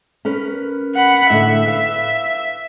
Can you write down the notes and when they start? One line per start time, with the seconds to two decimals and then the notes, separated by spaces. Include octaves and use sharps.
0.25 C#4 A#4 B4
0.96 F#5 B5
1.30 A2 D3 E5
1.66 B4 F5